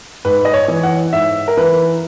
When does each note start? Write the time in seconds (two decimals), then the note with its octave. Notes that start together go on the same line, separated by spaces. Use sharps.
0.25 G#2 B4
0.45 D#5
0.54 C#5
0.68 E3
0.83 F#5
1.13 G#2 E5
1.48 A#4
1.57 E3 B4